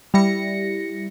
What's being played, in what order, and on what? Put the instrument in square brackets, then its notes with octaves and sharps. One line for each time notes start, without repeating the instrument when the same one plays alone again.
[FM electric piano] G3 E4 A#6 C#7